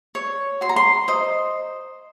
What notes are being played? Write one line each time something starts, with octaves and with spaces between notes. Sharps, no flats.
C#5
F#4 C6
A#5
C6
C5 D#5